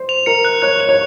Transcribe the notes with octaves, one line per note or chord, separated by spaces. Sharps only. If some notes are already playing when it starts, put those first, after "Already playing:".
Already playing: C5
F7
A#4 C#7
F#6
C#5 F#6
F7
C#5